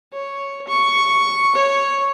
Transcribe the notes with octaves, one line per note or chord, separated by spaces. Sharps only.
C#5
C#6
C#5